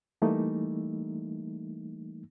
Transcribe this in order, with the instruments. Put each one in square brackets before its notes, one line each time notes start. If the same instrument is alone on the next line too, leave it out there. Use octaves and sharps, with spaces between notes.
[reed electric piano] E3 G3 A3 A#3 D#4